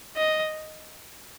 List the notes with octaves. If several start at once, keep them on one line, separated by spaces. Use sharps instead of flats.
D#5